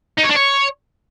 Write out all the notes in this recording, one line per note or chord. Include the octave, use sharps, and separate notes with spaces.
D#4
C#5
D4
C#5